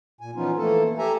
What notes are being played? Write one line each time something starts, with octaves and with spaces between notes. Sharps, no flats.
A#2 G#5
E3 F3 B3 C#4 D#4 F4
E3 A3 A#3 A4
G4 A4 E5 G#5 A#5